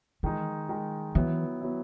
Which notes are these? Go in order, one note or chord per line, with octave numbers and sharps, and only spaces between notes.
D#3 E3 G#3 D#4
D#3 G#3 D#4
E3 F#3 B3 E4
F#3 B3 E4